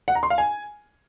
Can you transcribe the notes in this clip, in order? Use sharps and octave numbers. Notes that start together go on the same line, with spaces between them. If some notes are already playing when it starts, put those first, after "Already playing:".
F#5
A#5
C6
F5
G#5